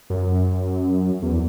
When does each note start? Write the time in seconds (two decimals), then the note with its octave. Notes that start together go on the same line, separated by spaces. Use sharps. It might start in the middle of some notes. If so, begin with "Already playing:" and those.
0.10 F#2
1.22 E2